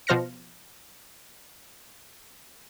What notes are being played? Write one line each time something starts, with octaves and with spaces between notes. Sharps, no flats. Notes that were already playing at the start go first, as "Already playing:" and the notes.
B2 F3 C5 F6 A#6 C#7